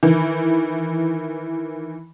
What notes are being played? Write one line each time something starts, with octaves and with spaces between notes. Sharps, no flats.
D#3 E3